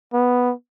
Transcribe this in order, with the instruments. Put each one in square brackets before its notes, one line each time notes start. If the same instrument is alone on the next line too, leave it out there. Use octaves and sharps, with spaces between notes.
[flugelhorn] B3